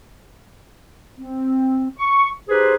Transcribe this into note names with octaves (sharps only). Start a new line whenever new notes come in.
C4
C#6
D#4 G4 G#4 B4 C5